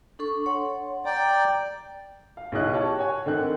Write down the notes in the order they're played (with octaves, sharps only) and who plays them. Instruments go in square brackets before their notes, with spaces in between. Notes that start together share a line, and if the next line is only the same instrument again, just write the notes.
[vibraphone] D4 A4 C#6
C#5 F#5 C6
[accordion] D5 G5 [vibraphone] A#5
[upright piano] F5
B1 C#3 C#4 E4 D#5 F#6
G4 C#5 A5
C#5 F#5 G#5
D3 D#3 C4 F#6